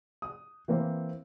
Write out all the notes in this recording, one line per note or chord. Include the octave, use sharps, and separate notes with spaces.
D#6
E3 A#3 C4